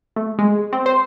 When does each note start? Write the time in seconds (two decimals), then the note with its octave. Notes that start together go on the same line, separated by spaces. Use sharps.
0.16 A3
0.39 G#3
0.73 C4
0.86 C5